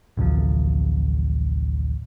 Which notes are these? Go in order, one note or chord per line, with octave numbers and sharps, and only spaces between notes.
A1 D2 C3 F3